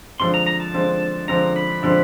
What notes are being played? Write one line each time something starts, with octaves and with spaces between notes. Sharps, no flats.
D3 F3 G#3 C4 C6
A#5
A#5
A5
D3 F3 G#3 C4
D3 F3 G#3 C4 A#5
B5
D3 F3 G#3 C4